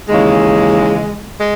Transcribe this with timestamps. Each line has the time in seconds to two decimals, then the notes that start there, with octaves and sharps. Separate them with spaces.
0.09 D#2 C#3 E3 G#3
1.39 G#3